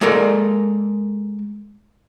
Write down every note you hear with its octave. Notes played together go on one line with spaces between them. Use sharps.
G#3 A#3 A4 A#4 D5